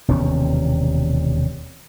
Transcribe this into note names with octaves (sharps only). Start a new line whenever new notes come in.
E1 D#2 C3 C#4